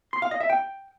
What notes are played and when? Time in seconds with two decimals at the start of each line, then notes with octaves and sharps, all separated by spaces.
0.13 C6
0.22 F5
0.31 D#5
0.40 E5
0.50 G5